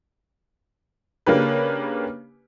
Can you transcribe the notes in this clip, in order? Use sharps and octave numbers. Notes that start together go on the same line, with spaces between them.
C#3 A#3 C#4 D4 G4 B4